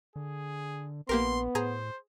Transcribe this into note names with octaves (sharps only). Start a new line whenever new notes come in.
D3 G#4
A#1 A#3 B3 G4 A#4 C6
A2 G#4 C5 G#5 A#5